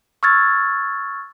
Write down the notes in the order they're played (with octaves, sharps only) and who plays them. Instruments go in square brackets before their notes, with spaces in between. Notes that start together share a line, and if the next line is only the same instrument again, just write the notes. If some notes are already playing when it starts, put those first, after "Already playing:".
[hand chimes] C#6 E6 F6 G#6 A6